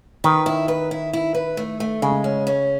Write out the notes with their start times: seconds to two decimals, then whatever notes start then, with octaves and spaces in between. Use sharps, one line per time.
0.24 D#3 B4
0.46 E4
0.68 B4
0.91 E4
1.13 E4
1.34 B4
1.57 A3
1.80 A3
2.02 C#3 G#3
2.24 C#4
2.47 C#4